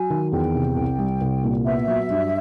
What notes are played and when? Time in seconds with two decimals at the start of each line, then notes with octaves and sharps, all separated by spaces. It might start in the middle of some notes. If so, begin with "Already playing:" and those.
Already playing: F#3 G#5
0.10 D#3
0.32 E2 G5
0.54 C3
0.77 C2
0.99 G3
1.21 C2
1.44 A#2
1.66 B3 E5
1.88 F#3
2.10 G2